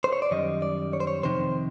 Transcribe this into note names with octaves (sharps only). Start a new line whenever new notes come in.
C5
C#5
D5
F#2 D#3 G3 D#5
D5
C#5
C5
C#5
F2 C3 D#3 C5